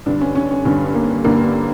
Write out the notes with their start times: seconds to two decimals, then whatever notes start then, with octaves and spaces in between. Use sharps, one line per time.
0.06 G2 D3 D4
0.21 C#4
0.35 C#4
0.51 C#4
0.65 G2 D3 C#4
0.95 A#3
1.24 G2 D3 A#3